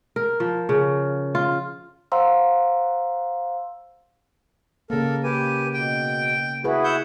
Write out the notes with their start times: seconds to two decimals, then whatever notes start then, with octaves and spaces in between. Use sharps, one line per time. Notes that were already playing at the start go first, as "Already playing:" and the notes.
0.16 A#4
0.40 F3
0.69 C#3
1.35 F4
2.12 C5 F5 F#5 A#5 C6 E6
4.90 C#3 A#3 A4 A#4
5.23 G4 B4 G#5
5.73 B2 G5
6.64 E4 F#4 G#4 B4
6.84 E5 F#5 G6